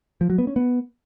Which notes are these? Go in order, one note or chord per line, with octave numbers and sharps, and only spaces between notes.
F3
F#3
B3
C#4
B3